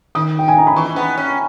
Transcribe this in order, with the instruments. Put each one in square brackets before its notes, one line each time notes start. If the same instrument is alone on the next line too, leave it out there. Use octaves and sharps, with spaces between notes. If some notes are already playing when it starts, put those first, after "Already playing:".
[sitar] D#3 [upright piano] D#6
[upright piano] G5
G#5
A#5
B5
[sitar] E3 [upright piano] C#6
[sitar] B3
C#4